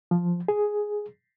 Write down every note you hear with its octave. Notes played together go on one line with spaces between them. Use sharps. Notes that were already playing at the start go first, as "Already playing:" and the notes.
F3
G#4